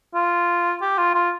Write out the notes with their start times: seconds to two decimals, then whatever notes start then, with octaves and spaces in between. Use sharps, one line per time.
0.14 F4
0.81 G4
0.98 F4
1.15 F4